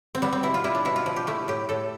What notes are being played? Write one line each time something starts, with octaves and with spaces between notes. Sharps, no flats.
C4
G3 B3
C4
B2 E4
F4
G3 E4
D4
B2 E4
F4
F3
G4
A3 E4
A2 G4
A2 A4